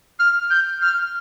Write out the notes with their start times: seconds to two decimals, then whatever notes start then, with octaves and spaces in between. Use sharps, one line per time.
0.19 F6
0.50 G6
0.82 F6